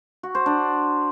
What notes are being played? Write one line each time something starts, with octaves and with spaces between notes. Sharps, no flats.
F#4
C5
D4